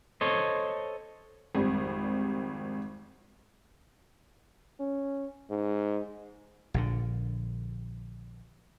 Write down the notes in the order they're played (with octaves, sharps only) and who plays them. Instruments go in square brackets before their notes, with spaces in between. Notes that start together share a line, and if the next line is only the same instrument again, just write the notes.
[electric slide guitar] A4 C5 C#5 D#5
[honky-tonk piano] G#1 F2 G3
[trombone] C#4
G#2
[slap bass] A#1 A#2 D3